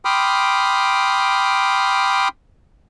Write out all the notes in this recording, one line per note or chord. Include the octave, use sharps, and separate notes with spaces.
G5 B5 C6 D6 D#6 F6